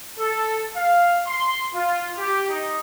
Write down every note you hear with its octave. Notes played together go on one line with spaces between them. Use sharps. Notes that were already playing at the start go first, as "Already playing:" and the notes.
A4
F5
C6
F4
G4
D#4